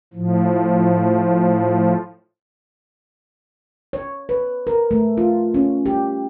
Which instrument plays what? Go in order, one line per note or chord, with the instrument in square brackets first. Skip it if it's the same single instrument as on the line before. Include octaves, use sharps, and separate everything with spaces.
[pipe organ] A2 F3
[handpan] C#5
B4
A#4
A3
F4
C#4
G4